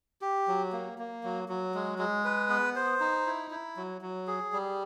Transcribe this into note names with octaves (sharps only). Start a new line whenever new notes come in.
G4
F#3
A#3
A#3
F#3
F#3
G#3
G#3
B4
B3
C5
D#4
E4
E4
F#3
F#3
G#4
G3